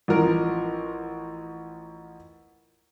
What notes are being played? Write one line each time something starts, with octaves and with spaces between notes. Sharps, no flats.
A1 F3 A#4